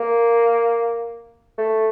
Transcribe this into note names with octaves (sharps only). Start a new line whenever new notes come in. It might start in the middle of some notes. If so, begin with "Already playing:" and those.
Already playing: A#3
A3